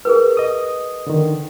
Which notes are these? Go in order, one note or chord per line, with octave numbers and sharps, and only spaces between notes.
G#4 A#4 B4
D#5 D#6
D3 D#3